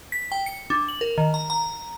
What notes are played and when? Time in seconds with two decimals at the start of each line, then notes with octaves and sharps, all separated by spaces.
0.12 B6
0.32 G5
0.46 C#7
0.70 D4
0.89 F#7
1.01 A#4
1.18 D#3
1.34 A#5
1.50 A#5